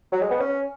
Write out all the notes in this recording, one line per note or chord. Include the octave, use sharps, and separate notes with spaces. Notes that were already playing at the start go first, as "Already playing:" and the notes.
F#3
G#3
B3
C#4